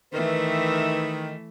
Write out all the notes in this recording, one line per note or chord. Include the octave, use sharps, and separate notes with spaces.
D#3 E3 A3 B4 E5